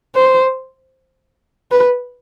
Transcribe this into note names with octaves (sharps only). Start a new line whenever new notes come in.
C5
B4